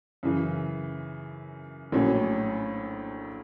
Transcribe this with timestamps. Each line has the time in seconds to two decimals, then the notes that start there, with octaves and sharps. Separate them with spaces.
0.23 F#2 C#3 E3
1.92 A#1 A2 F#3 A#3 C#4